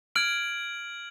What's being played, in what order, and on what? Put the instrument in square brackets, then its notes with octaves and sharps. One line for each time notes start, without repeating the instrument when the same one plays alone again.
[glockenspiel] F6 D7 [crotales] G#6 F#7